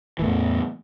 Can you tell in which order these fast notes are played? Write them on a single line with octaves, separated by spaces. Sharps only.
E3 A2 E2